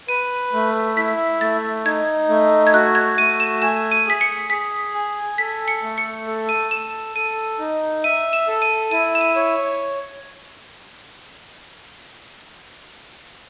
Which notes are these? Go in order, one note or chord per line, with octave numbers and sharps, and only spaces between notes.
B4 D#7
A3
E4 B6
A3 A6
D#4 G#6
A3
G#6
F#4 F#6
G#6
A3 D#7
E7
G#5 E7
D#7
G#4 B6
C#7
G#4 B6
G#5
A4 B6
C#7
A3
C#7
A4
D#7
A4 E7
A4 D#7
D#4
E5 D#7
E7
A4
D#7
E4 D#7
E7
D#7
C#5